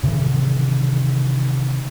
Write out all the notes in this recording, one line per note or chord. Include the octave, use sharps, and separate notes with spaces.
C3 D#3 E3